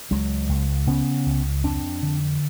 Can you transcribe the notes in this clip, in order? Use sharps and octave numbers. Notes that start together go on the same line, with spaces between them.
C#2 F#3 G#3
C#2
C#3 B3 C#4
C#2
F2 C4 D4
D3